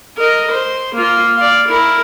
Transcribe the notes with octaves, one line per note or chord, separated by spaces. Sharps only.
A#4 D#5
C5
A#3 F4
D5 F5
E4 A#4